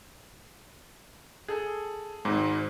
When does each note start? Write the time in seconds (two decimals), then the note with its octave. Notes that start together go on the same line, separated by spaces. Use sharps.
1.48 G#4 A4
2.25 G#1 G#2 C4